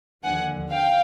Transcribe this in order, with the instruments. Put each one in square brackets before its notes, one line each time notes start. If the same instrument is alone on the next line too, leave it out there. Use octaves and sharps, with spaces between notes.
[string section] D#2 D3 F3 F#5 G#5
F5 G5